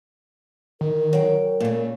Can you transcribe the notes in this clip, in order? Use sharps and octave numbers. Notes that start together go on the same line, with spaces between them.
D#3 A#4
F#3 G5
A#2 C#3 A3